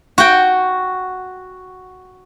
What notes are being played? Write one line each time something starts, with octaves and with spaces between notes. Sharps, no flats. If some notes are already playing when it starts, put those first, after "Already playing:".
F#4 G5